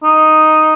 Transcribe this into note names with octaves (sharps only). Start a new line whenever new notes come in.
D#4